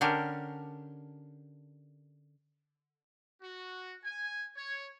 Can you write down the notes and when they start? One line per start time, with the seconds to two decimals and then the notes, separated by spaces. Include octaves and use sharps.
0.01 D3 C#4 D4 G4 A#4
3.41 F#4
4.03 G#5
4.56 C#5